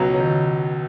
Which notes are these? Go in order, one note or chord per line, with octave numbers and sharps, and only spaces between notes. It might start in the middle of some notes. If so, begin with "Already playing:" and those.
Already playing: C#2 B2 F#3
C#3
D#3